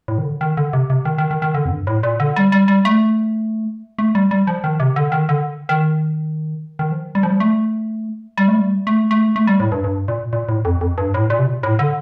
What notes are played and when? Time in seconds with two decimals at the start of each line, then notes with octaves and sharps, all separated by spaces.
0.08 A2
0.18 D#3
0.24 D3
0.41 D#3
0.57 D3
0.73 C3
0.90 C3
1.05 D#3
1.18 D#3
1.31 D#3
1.42 D#3
1.54 D3
1.65 F2
1.71 G2
1.87 A2
2.03 A#2
2.20 D3
2.36 G3
2.52 G3
2.68 G3
2.85 A3
3.99 A3
4.15 G3
4.31 G3
4.47 F3
4.64 D#3
4.80 C3
4.96 D3
5.12 D#3
5.29 D3
5.69 D#3
6.79 D#3
6.92 F3
7.15 G3
7.23 F3
7.30 G3
7.40 A3
8.38 G3
8.48 A3
8.58 G3
8.87 A3
9.11 A3
9.36 A3
9.47 G3
9.60 A2
9.72 G2
9.84 G2
10.08 A#2
10.33 A#2
10.49 A2
10.65 F2
10.81 F2
10.98 G2
11.14 A2
11.30 A#2
11.39 C3
11.46 A#2
11.63 A2
11.79 D3